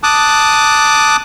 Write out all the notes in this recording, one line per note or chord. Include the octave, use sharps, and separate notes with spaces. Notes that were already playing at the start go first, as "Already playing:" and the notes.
A5 D6 D#6 F#6